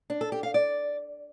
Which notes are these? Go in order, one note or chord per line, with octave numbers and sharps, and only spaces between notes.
D4
A4
G4
F5
D5